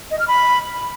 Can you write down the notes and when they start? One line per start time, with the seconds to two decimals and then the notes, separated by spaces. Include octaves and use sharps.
0.11 D#5
0.19 F6
0.28 B5